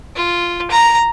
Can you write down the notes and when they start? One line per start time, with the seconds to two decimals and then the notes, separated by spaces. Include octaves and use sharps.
0.16 F4
0.71 A#5